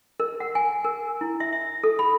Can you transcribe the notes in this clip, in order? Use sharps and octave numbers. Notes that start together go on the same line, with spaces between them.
A#4
F#5
G#5
A#4
E4
E5
E5
A4
B5